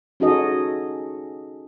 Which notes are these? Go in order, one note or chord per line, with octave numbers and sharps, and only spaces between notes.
C#4 D#4 F#4 G#4 A4 D#5